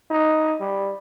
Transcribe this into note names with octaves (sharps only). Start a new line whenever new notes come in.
D#4
G3